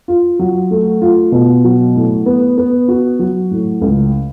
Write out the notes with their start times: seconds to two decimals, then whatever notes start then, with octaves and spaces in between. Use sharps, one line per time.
0.08 F4
0.39 F#3
0.71 A3
1.02 F4
1.32 B2
1.64 F#3
1.95 A2
2.26 B3
2.58 B3
2.88 F#4
3.19 F#3
3.51 A2
3.81 C#2